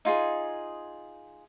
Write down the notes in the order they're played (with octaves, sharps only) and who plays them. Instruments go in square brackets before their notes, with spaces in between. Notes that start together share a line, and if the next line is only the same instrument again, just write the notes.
[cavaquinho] D#4 F4 G#4